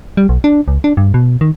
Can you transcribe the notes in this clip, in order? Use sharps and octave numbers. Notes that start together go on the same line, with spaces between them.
G3
B1
D4
C#2
D4
G2
B2
D#3